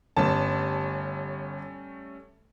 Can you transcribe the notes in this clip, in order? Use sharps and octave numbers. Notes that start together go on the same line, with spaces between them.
G1 G3 A3 C#4 A5